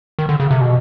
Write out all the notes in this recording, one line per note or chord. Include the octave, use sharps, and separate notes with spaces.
D#3
D3
C#3
C3
B2